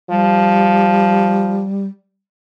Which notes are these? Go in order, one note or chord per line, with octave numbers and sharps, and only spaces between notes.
F3 G3